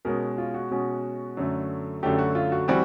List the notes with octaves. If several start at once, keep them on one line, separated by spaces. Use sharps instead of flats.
B2 G#3 C#4 A#4
F4
F#4
B2 G#3 C#4
F#2 D3 F#3 A3
F#2 D3 F#3 A3 G4
F#4
F4
F#4
E3 G3 C4 F#4